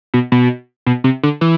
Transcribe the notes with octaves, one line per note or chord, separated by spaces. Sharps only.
B2
B2
B2
C3
D3
E3